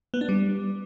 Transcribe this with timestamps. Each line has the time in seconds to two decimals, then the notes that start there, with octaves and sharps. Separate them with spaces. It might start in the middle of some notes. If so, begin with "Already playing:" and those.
0.14 B3
0.21 D4
0.29 G3